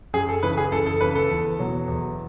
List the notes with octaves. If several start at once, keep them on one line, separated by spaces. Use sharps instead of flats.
F#2 G#4
A4
C#3 E3 B4
G#4
F#2 A4
A4
C#3 E3 B4
A4
E2
B2 F#3
E2